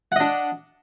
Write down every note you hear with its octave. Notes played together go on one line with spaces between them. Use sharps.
D4 D#5 F#5